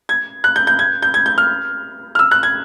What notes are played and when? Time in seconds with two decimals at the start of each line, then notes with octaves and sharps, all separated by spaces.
0.09 G#6
0.44 F#6
0.56 G6
0.67 G6
0.79 G#6
1.02 G6
1.14 G#6
1.26 G6
1.38 F6
2.15 F6
2.19 E6
2.31 F#6
2.43 G#6